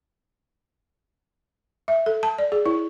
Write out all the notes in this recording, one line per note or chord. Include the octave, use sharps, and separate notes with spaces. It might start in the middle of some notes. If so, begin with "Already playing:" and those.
E5
A4
A5
D5
G#4
E4